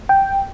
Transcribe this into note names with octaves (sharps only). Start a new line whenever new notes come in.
G5